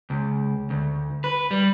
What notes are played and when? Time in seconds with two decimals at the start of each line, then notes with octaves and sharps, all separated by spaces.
0.10 C#2
0.70 D2
1.24 B4
1.51 G3